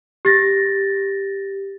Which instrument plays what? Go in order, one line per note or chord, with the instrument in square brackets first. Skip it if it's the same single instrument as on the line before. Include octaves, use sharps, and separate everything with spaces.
[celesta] G4 A6 A#6